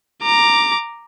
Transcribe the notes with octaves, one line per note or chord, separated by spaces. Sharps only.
A#5 D6